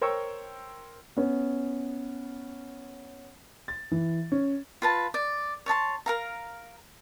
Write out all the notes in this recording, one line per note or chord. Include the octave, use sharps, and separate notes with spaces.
A#4 C5 C#5 G5 C#6 E6
B3 C#4
A6
E3
C#4
F4 B4 A5
D5
C#5 D5 A5 C6
A#4 F5 A#5